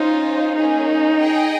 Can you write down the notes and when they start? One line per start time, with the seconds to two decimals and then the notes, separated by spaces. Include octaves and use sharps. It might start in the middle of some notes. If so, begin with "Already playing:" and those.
Already playing: C#4 D#4 F4 C5
0.55 A#3 C#4 D#4 G#4
1.21 G#4 D#5 G5